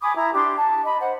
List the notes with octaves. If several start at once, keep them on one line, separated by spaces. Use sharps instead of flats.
G#5 B5 D6 D#6
E4 A#5
D4 G4 C6
A5
D#5 B5
C5 F#5